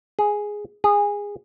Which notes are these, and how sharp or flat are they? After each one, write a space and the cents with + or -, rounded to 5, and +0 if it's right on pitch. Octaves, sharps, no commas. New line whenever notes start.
G#4 +0
G#4 -20